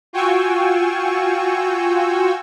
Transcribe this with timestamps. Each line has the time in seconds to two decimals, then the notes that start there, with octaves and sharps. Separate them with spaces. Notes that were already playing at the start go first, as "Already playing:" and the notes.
0.13 F4 F#4 G5 G#5 C#6 E6